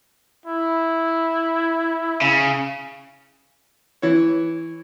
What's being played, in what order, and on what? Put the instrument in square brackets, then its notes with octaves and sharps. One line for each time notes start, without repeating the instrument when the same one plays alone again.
[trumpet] E4
[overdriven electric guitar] C#3
[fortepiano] E3 C#5